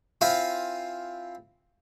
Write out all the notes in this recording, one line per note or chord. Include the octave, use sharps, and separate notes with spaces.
C4 E4 F4 F5 G#5